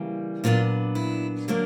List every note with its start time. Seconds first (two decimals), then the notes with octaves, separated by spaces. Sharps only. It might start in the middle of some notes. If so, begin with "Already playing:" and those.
Already playing: C#3 E3 G3 A#3
0.44 A#2 F#3 B3 D4 F4
0.95 E4
1.48 D3 F#3 A#3 D4